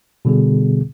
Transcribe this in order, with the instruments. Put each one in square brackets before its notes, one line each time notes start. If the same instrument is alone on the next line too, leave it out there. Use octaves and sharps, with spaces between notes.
[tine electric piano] B2 D3 G3 B3 G#4